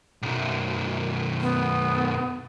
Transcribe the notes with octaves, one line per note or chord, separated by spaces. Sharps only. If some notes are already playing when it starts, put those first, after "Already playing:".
B1 F#2
B3